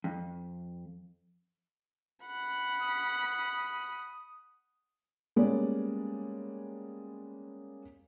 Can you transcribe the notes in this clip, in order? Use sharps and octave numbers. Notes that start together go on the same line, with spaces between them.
F2
F#5 B5
D#6
G3 G#3 A#3 B3 C#4 D5